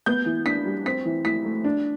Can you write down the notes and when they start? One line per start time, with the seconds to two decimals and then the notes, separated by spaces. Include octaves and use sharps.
0.06 B3 G6
0.26 E3
0.46 D4 B6
0.65 G3
0.86 C4 B6
1.06 E3
1.25 E4 B6
1.45 A3
1.64 D4